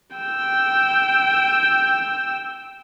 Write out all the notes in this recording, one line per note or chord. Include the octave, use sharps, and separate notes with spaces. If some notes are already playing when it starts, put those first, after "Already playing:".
G5 E6